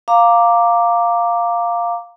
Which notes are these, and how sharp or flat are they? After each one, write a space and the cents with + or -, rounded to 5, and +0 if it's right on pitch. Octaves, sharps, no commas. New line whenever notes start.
F5 +0 A#5 -5 D6 +0